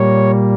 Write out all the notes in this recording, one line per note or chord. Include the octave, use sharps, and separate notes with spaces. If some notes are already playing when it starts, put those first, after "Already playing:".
Already playing: A#2 G3 A#3 C#5